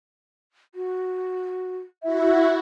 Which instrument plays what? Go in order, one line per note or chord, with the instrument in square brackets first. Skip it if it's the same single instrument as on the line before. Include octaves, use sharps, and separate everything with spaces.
[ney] F#4
[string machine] E4 F#4 [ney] E5